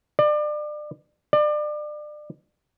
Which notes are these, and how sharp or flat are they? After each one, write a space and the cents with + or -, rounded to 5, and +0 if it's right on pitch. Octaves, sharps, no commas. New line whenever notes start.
D5 +30
D5 +30